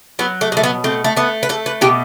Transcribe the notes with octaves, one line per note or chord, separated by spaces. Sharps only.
F#3 B3
A3
B2 A3
B3
A3 C4
A3
A3 B3
B4
A3 A4
B4
B2 G4